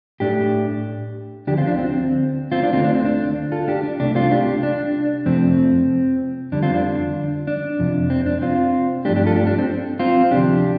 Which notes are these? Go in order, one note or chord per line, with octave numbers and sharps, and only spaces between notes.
A2 A3 D4 G4
D2 D3 F3 D4 G4
C4 F4
D4
C4
C4 F4
D4
D2 D3 A3 C4 F4
D4
C4
D4
F4 A4
D4 G4
D4
C2 C3 A3 D4
C4 F4
D4 G4
D4
F2 C3 F3 A3 C4
F2 D3 G3 D4
C4 F4
D4
D4
F2 C3 F3
C4
D4
C4 F4
G2 F3 A3 D4 G4
D4 G4
F4 A4
D4 G4
D4
C4
C4 F4
D2 C3 F3 D4 G4